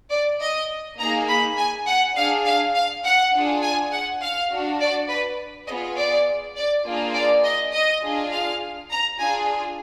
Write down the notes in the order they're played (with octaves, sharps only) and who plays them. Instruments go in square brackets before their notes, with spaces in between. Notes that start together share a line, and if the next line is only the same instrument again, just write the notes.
[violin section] D5
D#5
A#3 D#4 G#4 A#5
B5
G#5
F#5
D4 G#4 F5
F5
F5
F#5
D4 F4 G#4
G#5
F#5
F5
D4 F#4
D5
B4
B3 F4 G#4 D#5
D5
D5
A#3 D4 F4 G#4
D5
D#5
D#5
D4 F4 G#4
F5
A#5
D4 F4 G#4 G#5